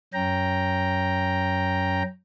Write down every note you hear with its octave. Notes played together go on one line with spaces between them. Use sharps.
F#2 C#4 G5 A#5